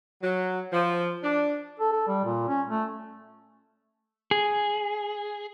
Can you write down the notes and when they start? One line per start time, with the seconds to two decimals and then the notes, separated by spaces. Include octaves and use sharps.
0.22 F#3
0.72 F3
1.23 D4
1.80 A4
1.93 A4
2.08 G3
2.25 A#2
2.48 C#4
2.70 A3
4.31 G#4